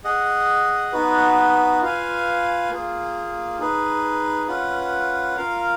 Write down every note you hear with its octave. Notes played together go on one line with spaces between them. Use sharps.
G#4 D#5 F#5
B3 D#4 F#4 B4
F4 B4 F5 G#5
A#3 F4 G#4
D#4 G#4 B4
C#4 F4 B4 F#5
F4 A#4 F5